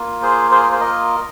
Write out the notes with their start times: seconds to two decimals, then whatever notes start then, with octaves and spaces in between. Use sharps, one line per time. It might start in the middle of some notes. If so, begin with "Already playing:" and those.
Already playing: A#3 F4
0.22 G#4 C5
0.51 G#4 C5
0.63 A#4
0.72 C5
0.81 A#4 D#5